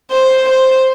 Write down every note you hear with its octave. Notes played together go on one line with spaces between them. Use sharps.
C5
C5